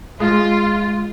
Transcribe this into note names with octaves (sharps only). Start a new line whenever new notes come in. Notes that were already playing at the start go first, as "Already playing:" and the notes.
G#3 F4